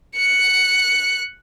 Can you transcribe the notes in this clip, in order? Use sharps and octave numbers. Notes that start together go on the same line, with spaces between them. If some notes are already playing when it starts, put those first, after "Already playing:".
F#6 C#7